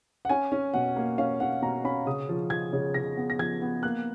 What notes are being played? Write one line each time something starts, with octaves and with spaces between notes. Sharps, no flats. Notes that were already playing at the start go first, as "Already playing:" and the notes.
F#5
C#4 G#5
C#4
B2 F#5
A#3
C#4 F5
C#4 F#5
B2 A#5
C#4 B5
C#3 D#6
F3
F3 G#6
C#3
C#3 A#6
B3
A#6
F3 G#6
B3
A#3 F#6